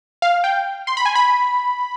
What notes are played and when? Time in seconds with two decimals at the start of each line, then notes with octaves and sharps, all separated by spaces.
0.22 F5
0.44 G5
0.87 C6
0.97 B5
1.06 G#5
1.15 B5